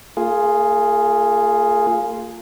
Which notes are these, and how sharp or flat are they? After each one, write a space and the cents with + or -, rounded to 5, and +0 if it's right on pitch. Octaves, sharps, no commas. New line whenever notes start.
A#3 -45 F4 +0 G#4 +0